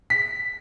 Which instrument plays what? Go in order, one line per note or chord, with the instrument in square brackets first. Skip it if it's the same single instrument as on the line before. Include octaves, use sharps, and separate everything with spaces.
[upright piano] B6